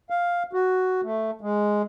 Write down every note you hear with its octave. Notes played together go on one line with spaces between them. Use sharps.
F5
F#4
A3
G#3